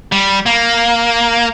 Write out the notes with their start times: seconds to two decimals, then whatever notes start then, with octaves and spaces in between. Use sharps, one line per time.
0.12 G3
0.46 A#3